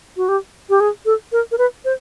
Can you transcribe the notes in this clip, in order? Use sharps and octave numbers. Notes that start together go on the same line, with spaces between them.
F#4
G4
G4
G#4
A4
A#4
A#4
B4
C5